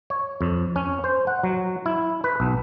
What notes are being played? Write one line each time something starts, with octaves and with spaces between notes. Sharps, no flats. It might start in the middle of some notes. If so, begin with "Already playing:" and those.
C#5
F2
C#4
C5
F#5
F#3
E4
B4
B1